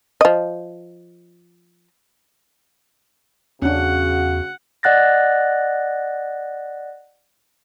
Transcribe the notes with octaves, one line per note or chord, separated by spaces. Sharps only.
F3 D#5
E2 C#3 C#4 D4 F#4 F#5
D5 D#5 F#5 F#6 A6 A#6